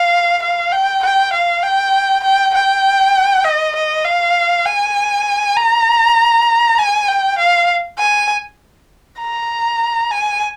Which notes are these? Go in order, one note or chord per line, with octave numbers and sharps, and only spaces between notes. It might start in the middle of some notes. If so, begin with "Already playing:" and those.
Already playing: F5
F5
G5
G5
F5
G5
G5
G5
D#5
D#5
F5
G#5
A#5
G#5
G5
F5
G#5
A#5
G#5